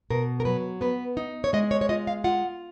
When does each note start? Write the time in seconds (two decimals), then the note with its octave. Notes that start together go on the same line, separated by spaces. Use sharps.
0.10 B2 A#4
0.40 A#4
0.45 F#3 B4
0.81 B3 B4
1.17 D#4
1.44 C#5
1.53 G#3 D#5
1.71 C#5
1.81 C#5
1.89 F4 D#5
2.07 F5
2.24 F4 F#5